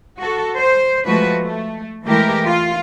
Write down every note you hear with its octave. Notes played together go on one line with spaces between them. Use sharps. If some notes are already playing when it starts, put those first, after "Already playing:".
F#4 A4
C5
F3 G#3 A3 F#4 B4
A3
E3 G#3 A3 E4 G4 A#4
F4